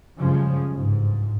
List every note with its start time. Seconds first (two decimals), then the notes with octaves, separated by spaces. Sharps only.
0.18 F#2 C#3 F3 G3 G#3 C#4
0.72 G1 C#2 G#2